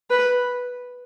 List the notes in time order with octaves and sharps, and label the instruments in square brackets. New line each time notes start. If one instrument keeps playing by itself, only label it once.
[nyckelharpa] B4